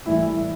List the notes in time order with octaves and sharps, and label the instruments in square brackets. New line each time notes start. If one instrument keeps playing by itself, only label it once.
[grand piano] A2 E3 G3 E4